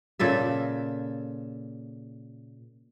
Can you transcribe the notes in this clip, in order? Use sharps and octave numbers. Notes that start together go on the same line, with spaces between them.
A#2 C#3 A4 E5